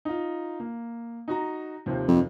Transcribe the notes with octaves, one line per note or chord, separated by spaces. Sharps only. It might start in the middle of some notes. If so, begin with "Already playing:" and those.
D#4 F4
A#3
D#4 F#4 A#5
D#2 C3 F3
F2